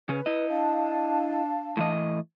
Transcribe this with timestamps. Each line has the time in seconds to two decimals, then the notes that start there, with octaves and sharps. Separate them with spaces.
0.09 C#3 C#4 B4
0.26 E4 D#5
0.49 D4 F5 A5
1.77 A2 E3 D#5